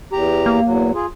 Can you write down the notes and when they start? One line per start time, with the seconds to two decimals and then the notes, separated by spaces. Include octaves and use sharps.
0.12 E2 G4 A#5
0.46 A#3
0.66 E2 F#3
0.94 F4 G#4